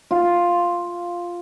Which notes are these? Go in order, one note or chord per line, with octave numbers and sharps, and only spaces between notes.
F4